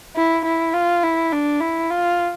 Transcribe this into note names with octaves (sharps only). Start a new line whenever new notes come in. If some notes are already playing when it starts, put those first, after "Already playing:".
E4
E4
F4
E4
D4
E4
F4